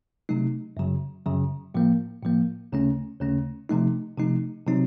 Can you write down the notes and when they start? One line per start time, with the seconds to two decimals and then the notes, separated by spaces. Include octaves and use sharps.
0.29 C3 F#3 A3 D#4
0.77 F#2 C#3 F#3
1.26 F#2 C#3 F#3
1.74 A2 F3 A#3
2.23 A2 F3 A#3
2.72 D#2 C#3 A3 C#4
3.20 D#2 C#3 A3 C#4
3.69 C3 F3 A3 D#4
4.18 C3 F3 A3 D#4
4.66 C3 F#3 C4 D#4